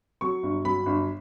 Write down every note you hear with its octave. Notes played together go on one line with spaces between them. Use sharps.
F#3 C#6
G1
F#3 B5
G1